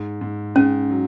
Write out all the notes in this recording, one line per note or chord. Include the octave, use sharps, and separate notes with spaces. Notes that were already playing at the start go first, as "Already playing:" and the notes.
Already playing: G#2
G#2
G#2 C#4
F#3